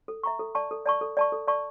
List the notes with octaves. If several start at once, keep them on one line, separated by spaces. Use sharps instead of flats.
A4
E5 A#5 C#6
A4
D5 A5 C#6
A4
D5 A5 C#6
A4
D5 A5 C#6
A4
D5 A5 C#6